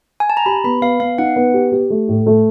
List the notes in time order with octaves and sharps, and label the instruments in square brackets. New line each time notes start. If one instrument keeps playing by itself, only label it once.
[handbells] G#5
A5
A#5
[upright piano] G4 [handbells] B5
[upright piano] B3 [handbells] B5
[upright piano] B3 [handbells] F5
[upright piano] B3 [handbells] F5
[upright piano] D#4 [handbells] F#5
[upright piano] B3
G4
G4
A3
A2
A3